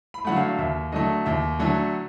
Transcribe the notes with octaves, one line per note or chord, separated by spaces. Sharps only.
B5
D3 F#3 A3 F#5
F5
D#2 E5
D3 F#3 A3 D#5
D#2 E5
D3 F#3 A3